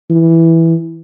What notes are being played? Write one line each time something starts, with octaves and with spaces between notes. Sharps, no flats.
E3